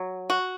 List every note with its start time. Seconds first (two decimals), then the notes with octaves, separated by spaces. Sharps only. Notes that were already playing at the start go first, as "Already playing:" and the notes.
Already playing: F#3
0.30 F#4